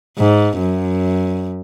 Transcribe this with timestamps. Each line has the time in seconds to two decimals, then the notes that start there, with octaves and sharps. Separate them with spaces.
0.18 G#2
0.58 F#2